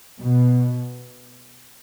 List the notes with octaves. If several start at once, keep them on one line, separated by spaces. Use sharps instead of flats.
B2